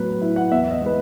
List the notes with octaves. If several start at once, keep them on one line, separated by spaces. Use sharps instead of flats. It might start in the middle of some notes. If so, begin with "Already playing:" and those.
Already playing: A2 F#3 B3 B4
E4
F#5
E2 E5
D#5
G#3 B4